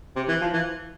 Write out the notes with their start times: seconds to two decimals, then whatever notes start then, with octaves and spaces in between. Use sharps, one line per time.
0.16 C3
0.29 E3
0.41 F3
0.53 E3